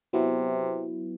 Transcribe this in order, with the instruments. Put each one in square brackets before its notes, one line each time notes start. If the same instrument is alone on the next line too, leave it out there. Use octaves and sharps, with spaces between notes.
[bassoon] C3 [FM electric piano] F#3 B3 E4